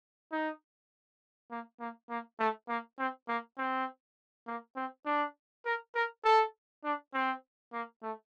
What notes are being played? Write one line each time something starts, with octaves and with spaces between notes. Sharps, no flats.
D#4
A#3
A#3
A#3
A3
A#3
C4
A#3
C4
A#3
C4
D4
A#4
A#4
A4
D4
C4
A#3
A3